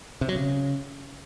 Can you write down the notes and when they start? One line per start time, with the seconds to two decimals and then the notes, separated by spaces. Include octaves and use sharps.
0.21 C3
0.28 F#3
0.36 C#3